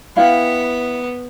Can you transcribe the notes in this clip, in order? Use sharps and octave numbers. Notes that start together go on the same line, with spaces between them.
B3 E4 F5 G5